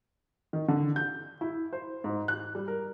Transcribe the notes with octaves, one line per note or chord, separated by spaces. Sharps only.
D#3
D3
G6
E4
C5
G#2
F#6
G3
A#4